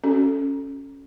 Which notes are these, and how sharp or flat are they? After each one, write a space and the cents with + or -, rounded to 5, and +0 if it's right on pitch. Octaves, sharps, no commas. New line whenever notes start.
C#4 +0 F#4 +25 A4 +0